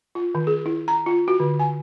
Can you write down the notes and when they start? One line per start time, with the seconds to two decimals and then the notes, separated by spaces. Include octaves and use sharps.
0.15 F4
0.35 D#3
0.47 G#4
0.66 E4
0.88 A#5
1.06 F4
1.28 F#4
1.40 D3
1.59 G#5